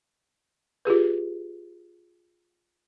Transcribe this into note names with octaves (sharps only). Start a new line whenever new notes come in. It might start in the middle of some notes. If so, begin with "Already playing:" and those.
F4 G4 G#4 B4